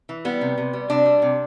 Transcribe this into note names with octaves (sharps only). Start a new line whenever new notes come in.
E3
G3 B3
C3
C3
G3
C3 D4
G3
C3